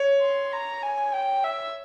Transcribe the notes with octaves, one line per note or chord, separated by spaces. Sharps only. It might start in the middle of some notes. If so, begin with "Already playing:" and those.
Already playing: C#5
C6
A#5
G#5
G5
E5